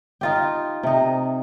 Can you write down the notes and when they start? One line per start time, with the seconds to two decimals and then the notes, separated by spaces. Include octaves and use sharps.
0.21 D#4 F4 G4
0.83 C3 D#4